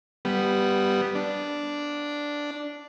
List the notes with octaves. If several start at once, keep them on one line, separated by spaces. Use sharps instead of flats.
G3 B3
D4